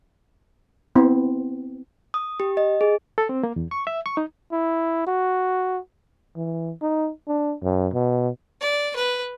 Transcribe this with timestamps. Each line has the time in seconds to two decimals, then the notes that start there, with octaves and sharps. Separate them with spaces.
0.95 B3 C4 E4
2.14 D#6
2.40 G4
2.57 D#5
2.81 G#4
3.18 A4
3.29 C4
3.43 A#3
3.56 E2
3.71 C#6
3.87 E5
4.06 C#6
4.17 D#4
4.52 E4
5.07 F#4
6.36 E3
6.82 D#4
7.28 D4
7.62 F#2
7.93 B2
8.60 D5
8.95 B4